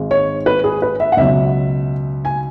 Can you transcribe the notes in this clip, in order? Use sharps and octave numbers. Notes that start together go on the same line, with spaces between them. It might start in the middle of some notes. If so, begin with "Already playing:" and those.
Already playing: G#1 G#2 G#3
C#5
B4
G#4
B4
E5
F#5
C#2 B2 F#3 E5
G#5